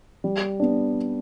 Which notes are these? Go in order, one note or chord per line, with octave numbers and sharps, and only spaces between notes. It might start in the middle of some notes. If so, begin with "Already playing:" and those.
G3
B3 D4